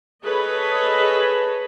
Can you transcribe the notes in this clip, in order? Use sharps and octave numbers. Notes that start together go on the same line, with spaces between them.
G#4 A4 B4 C#5 D#5